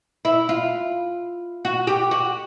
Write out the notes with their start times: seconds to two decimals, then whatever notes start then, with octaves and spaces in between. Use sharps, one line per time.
0.25 E4
0.49 F4
1.65 F#4
1.87 G4
2.11 F#4